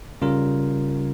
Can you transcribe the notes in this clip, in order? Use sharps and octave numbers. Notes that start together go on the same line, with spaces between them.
C#3 G3 C#4 F4 A#4